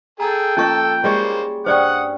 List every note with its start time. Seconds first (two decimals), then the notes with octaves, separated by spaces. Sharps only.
0.20 G#4 A4 G5 A#5
0.57 F3 A#3 C#4 A4 D#5 A5 C#6
1.04 G3 G#3 A#3 C5 C#5
1.66 G2 C#4 C5 D5 F#5 G5 D#6